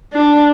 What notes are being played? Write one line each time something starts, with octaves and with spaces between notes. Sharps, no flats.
D4